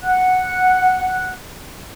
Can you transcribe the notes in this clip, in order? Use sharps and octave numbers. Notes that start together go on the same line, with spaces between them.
F#5 F#6